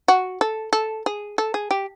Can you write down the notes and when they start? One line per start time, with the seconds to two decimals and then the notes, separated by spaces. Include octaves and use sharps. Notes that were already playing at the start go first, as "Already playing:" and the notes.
0.08 F#4
0.41 A4
0.73 A4
1.06 G#4
1.38 A4
1.54 G#4
1.71 G4